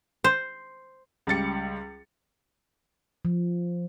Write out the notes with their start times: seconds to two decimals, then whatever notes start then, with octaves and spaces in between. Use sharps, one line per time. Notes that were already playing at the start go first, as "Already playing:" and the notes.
0.24 C5
1.27 C#2 G3 A6 C#7
3.25 F3